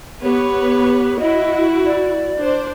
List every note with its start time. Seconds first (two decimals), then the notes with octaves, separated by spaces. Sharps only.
0.23 B3 G4 B4 C#5
1.19 E4 F#4 D#5
1.85 D5
2.38 D4 C5